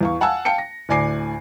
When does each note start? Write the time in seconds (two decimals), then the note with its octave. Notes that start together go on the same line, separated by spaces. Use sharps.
0.01 E2 F5 C#6
0.21 F5 F#5 G#5 A5 E6
0.45 F5 G5 A5 C#7
0.58 A#6
0.89 D2 A2 D5 G#5 D6 C7